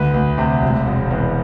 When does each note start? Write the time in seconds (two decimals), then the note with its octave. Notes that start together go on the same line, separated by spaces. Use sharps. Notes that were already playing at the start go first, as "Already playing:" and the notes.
Already playing: D2 B4
0.14 D2
0.38 C3
0.62 E1
0.86 E1
1.11 E2